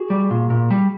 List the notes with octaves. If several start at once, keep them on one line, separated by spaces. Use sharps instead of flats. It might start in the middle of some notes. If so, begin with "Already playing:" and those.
Already playing: F#4 G#4
G3
A#2
A#2
G3